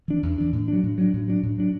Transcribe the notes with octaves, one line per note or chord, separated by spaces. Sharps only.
E3 D4
E2
E3 D4
A2
F#3 D4
A2
F#3 D4
A2
F#3 D4
A2
F#3 D4